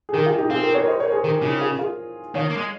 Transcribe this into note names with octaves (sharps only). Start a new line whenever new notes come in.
G#4
D#3 G4 A#4
F4 G#4
D#4 G4
C4 F4 G#4
G4 A#4
A#4 C#5
C5 D#5
A#4 C#5
G#4 C5
D#3 G4 A#4
C#3 D#4 G4
F4 G#4
F4 G#4
D#3 C#5 F5
A#3
G#3